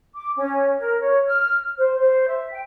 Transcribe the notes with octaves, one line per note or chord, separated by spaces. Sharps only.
D6
C#4
A#4
C#5
F6
C5
C5
E5
G5